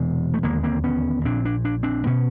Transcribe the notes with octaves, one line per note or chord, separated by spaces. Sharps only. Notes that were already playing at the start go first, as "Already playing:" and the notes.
Already playing: E1 E2 C3 B3
A3
E1 D#2 D3 G#3 A#3
A#3 C4
B3 C#4
A#1 A#2 C4 D4
D4
D4
C4 D4
B2 B3 C#4